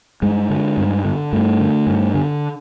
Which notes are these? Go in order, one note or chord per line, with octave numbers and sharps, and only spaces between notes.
G2 G#3
D3
G2
D3
G2 A3
D3
G2
D3